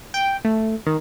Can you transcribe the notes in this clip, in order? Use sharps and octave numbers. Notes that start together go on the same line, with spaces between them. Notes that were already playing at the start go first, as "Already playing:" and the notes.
G5
A3
D#3